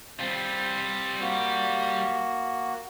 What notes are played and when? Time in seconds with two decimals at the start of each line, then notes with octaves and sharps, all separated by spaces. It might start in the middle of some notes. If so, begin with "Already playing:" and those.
0.20 G3 C4 F4
1.21 A#3 F#4